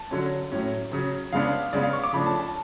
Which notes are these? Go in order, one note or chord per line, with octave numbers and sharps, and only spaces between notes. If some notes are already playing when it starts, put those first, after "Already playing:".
Already playing: A5
D3 F#3 C#4
A2 F#3 C#4
C#3 F#3 C#4
C#3 G#3 B3 D4 F5
C#3 G#3 B3 D5
F5
C#6
D6
C#3 F3 A3 D4 B5
A5
A5